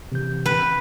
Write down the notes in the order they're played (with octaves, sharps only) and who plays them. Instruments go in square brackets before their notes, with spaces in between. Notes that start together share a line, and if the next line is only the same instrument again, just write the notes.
[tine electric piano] C3 E3 G6
[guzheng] B4